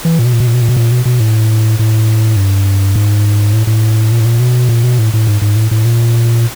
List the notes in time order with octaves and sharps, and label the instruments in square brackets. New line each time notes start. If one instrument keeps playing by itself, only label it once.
[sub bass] E3
A#2
B2
A#2
B2
A#2
B2
A#2
B2
A#2
B2
B2
A2
A2
G2
G#2
A2
A2
A#2
A2
A#2
B2
A#2
B2
A2
A2
G#2
G#2
A2
A2
A#2